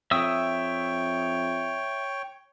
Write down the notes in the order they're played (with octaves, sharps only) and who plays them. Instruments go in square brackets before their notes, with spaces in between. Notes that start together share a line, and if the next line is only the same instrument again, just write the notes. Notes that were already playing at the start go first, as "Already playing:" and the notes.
[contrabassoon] F2 [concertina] C#5 G5 [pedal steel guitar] E5 D#6 E6